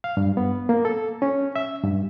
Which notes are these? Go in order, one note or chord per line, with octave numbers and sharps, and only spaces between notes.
F5
G2
B3
A#3
A4
C#4
E5
G2